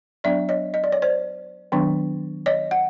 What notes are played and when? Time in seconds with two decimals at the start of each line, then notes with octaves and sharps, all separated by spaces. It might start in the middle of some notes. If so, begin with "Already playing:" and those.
0.24 F#3 B3 D4 D5 E5
0.49 C#5 D#5
0.74 D#5
0.84 D5
0.92 C#5
1.02 C5 D5
1.72 D#3 F#3 B3 D4
2.46 C#5 D#5
2.71 F#5